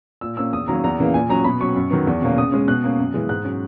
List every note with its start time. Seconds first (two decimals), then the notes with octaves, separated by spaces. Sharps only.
0.21 A#2 E6
0.37 A#3 C#4 E6
0.52 E2 D#6
0.68 D#3 F#3 A#3 C#4 A#5
0.84 E2 A#5
0.99 C#3 E3 A#3
1.14 A#2 G#5
1.29 F#3 C#4 A#5
1.44 B2 B5
1.60 F#3 C#4 C#6
1.76 F#2
1.91 D#3 F#3 B3
2.07 E2
2.22 B2 A#3 C#4
2.37 C#3 D#6
2.52 G#3 C#4
2.67 B2 F#6
2.84 A#3 C#4
2.99 F#2
3.14 C#3 E3 G#3
3.29 G#2 F#6
3.45 F#3 C#4